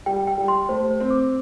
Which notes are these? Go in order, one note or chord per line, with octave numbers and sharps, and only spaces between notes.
G3 G5
G5
G3
C6
A3 C5
C5
C4
D6